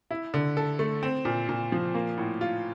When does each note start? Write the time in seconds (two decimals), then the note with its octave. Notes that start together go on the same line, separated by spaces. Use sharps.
0.11 E4
0.34 D3
0.57 A4
0.79 A3
1.03 C4
1.25 A#2
1.49 A#2
1.72 F3
1.94 A#3
2.18 A2
2.41 F4